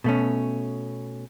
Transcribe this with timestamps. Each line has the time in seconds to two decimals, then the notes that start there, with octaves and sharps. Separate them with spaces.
0.04 B2 A3 C#4